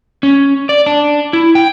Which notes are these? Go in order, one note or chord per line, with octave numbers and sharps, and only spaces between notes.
C#4
D5
D4
E4
G5